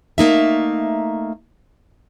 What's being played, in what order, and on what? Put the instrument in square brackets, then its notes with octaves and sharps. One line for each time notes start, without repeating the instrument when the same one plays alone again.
[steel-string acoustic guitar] A3 A#3 D#4 E5